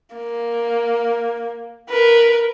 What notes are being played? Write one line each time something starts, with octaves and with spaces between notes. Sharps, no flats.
A#3
A#4 B4